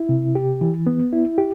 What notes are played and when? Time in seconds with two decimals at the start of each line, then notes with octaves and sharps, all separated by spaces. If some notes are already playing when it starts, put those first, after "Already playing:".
Already playing: E4
0.09 C3
0.35 G4
0.61 E3
0.87 B3
1.12 E4
1.38 G4